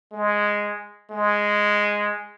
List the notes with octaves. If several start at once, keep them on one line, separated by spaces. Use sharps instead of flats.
G#3
G#3